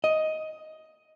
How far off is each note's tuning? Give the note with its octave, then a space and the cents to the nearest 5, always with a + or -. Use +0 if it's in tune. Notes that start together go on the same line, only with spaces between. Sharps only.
D#5 +10